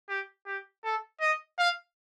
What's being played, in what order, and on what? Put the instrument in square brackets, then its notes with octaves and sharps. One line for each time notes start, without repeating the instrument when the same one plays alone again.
[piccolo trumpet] G4
G4
A4
D#5
F5